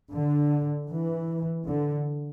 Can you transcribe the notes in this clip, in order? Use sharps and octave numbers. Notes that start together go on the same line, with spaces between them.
D3
E3
D3